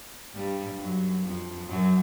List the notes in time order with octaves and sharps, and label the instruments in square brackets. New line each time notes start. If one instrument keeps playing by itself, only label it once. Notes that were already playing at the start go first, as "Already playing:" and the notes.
[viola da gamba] G2 G3
F#2 F#3
F2 F3
F#2 F#3